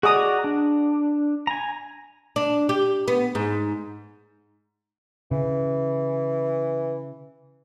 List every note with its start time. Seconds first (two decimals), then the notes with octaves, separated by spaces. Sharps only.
0.03 F#4 G#4 D5 A#5 D#6
0.44 D4
1.47 G#5 A#5
2.36 D4
2.69 G4
3.08 B3
3.35 G#2
5.31 C#3 E3